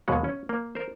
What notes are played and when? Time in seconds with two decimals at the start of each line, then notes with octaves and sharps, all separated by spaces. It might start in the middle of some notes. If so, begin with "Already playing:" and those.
0.08 D#2 B2 F#3 G#3 F#5
0.24 C#4
0.49 A#3
0.75 A#4 C5